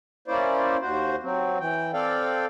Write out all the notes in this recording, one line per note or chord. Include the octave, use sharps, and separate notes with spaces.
A#3 C#4 E4 C5 D5
D#2 F#4 C5
F#3 C4
E3 G5
C4 A4 D5 F5 G5